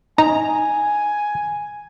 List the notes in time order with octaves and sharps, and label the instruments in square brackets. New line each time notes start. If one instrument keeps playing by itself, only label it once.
[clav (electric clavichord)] D#4 [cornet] G#5 [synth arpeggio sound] A#5